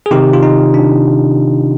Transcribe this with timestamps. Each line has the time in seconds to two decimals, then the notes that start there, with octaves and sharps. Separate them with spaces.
0.06 G#4
0.11 C3 D#3 D#4 G4
0.33 F4
0.43 D#4
0.74 D4